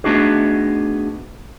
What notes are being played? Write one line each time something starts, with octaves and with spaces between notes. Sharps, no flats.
A3 B3 D4 D#4 F#4 G#4